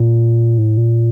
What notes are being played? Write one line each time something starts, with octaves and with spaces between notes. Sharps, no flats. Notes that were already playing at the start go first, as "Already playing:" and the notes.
Already playing: A#2
A2
A#2